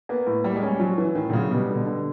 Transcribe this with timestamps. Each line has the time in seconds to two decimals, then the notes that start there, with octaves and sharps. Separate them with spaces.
0.09 A#3 B3
0.27 A2
0.44 G3 A#3
0.56 G#3
0.62 G3 C#4
0.80 F3 F#3
0.98 E3 C#4
1.15 A2 D#3
1.30 D3
1.33 C#3 F#3
1.50 B2 G3
1.68 D3
1.75 B2
1.86 D3